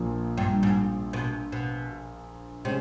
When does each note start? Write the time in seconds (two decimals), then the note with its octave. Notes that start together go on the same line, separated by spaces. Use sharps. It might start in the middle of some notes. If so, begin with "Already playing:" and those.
Already playing: A#1 A#2 F3 A#3
0.37 G2
0.63 G#2
1.13 B2
1.52 B2
2.65 C3 G#3 C#4